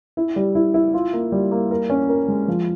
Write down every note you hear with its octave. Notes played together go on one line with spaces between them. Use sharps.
E4
G3
E4
E4
F4
A#3
G3
A#3
A#4
C#4
A#4
G#3
F3